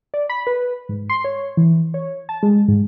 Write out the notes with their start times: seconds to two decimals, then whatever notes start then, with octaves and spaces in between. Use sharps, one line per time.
0.14 D5
0.29 B5
0.47 B4
0.89 G#2
1.10 C6
1.24 C#5
1.57 E3
1.94 C#5
2.29 A5
2.43 G#3
2.68 G#2